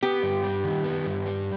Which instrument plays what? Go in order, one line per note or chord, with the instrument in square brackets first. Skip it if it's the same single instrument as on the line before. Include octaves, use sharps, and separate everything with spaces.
[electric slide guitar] B3 [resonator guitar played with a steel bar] G4
[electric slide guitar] G2
G3
D#3
B3
G2
G3